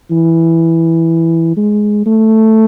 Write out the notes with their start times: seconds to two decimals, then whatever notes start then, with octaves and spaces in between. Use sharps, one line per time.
0.11 E3
1.57 G#3
2.06 A3